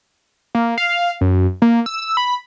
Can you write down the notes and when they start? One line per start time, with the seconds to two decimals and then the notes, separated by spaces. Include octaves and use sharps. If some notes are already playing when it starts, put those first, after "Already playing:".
0.55 A#3
0.78 F5
1.21 F#2
1.62 A#3
1.86 E6
2.17 B5